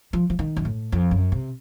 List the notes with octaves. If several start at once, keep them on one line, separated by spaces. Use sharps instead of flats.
F3
F3
D#3
F#2
A2
F2
F#2
C3